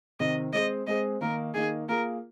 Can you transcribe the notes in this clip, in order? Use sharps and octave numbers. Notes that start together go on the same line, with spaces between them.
C3 D#3 C4 D#5
G#3 C4 G#4 C5 D#5
G#3 C4 G#4 C5 D#5
D#3 A#3 D#4 A#4
D#3 A#3 D#4 G#4
A#3 F4 G#4 A#4